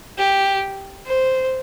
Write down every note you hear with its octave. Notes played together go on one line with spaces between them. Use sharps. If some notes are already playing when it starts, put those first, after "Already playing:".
G4
C5